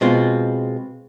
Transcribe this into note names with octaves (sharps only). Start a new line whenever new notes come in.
B2 G#3 C4 F4